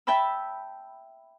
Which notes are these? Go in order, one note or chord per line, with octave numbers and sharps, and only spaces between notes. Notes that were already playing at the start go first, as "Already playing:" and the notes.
E5 G5 A5 B5 E6